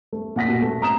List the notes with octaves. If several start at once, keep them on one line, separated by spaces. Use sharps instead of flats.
A3
A#2 F#5 A#6 B6
B2
A3
A#5 D#6 E7